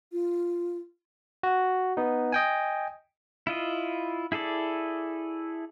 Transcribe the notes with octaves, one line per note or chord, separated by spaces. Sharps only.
F4
F#4
B3 D#4
D#5 G5 G#5
E4 F4 D#5
E4 G#4 A4 D5